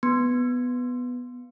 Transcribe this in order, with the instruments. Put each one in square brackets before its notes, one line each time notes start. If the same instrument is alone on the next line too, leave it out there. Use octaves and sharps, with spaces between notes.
[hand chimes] B3